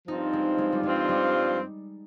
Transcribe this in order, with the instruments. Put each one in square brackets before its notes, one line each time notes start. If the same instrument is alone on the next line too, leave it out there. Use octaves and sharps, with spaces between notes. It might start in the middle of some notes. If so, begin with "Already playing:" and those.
[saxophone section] G2 F3 C4 F4 [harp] D#4
[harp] G#3
G#3
G3
[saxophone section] G2 F3 C4 F4 [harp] G#3
[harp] G3